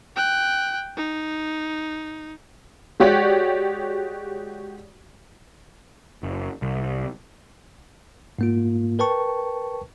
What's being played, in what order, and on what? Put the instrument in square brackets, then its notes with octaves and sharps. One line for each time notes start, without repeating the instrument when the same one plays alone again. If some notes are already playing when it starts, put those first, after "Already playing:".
[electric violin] G5 F#6
D#4
[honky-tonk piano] G#3 F#4 G4 C#5 D5
[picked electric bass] F#1
C2
[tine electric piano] G#2 A#3 F4
A#4 B4 G5 A5 C#6